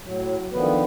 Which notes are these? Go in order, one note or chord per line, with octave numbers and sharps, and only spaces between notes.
A2 F#3
D3 D#3 F3 B3 B4